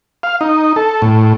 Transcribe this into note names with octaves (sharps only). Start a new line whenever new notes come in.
F5
D#4
A4
A2